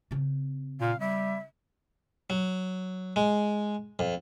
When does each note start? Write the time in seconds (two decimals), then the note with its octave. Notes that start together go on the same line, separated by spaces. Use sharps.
0.11 C#3 C4
0.81 A#2 F5
1.00 G3 E5
2.30 F#3
3.16 G#3
3.99 F2